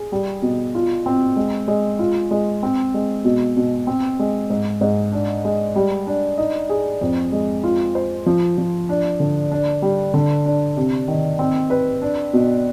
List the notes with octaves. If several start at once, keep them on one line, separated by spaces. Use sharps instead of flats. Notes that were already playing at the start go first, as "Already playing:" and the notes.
Already playing: G#4
G3
B2
F4
C4
G#3
G#3
F4
G#3
C4
G#3
B2
B2
C4
G#3
G#2
G#2
D4
G#3
G3
D4
D#4
G#4
F2
G#3
F4
C5
F3
F3
D4
D3
D4
G3
D3
D4
C3
D#3
C4
B4
D4
B2